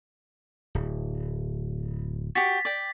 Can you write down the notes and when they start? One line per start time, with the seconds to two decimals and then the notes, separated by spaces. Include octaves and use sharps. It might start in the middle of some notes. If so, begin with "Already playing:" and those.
0.75 D1
2.35 F#4 G4 A6 B6
2.65 D5 G5